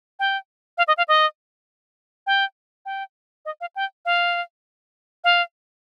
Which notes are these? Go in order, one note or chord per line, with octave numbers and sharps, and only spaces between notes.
G5
F5
D#5
F5
D#5
G5
G5
D#5
F5
G5
F5
F5